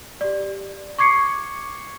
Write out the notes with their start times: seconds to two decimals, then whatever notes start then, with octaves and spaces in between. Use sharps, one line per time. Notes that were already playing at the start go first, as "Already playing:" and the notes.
0.21 G4 D5
0.99 C#6 D6 G#6 C7 C#7